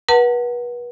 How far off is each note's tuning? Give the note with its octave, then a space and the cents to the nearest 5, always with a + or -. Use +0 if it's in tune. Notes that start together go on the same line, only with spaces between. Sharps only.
B4 -35 F#5 +5 A5 +35